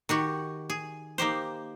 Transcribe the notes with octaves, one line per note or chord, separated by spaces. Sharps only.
D#3 F#4 G4
G#4
A#3 D#4 G4 C5